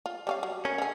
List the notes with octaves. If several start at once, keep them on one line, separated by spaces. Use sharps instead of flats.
F4
G3 C#4 F5
F#3
C#4 A#4
D3 G#4